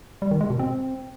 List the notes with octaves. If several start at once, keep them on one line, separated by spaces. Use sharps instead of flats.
G3
D#3
G#3
B2
C4